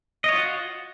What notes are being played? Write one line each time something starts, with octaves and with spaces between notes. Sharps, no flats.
F4 F#4 C#5 D#5